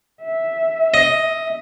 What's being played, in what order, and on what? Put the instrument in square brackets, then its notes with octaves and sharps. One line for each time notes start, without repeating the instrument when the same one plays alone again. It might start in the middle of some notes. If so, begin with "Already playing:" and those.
[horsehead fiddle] E5
[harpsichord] D#5